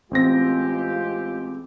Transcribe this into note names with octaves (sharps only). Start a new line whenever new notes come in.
A1 G#3 C4 F4 G4 A#6